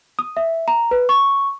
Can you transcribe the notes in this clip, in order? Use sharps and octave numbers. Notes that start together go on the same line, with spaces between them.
D#6
E5
A#5
B4
C#6